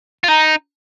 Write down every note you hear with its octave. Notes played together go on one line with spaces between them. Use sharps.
F4
D#4 A#5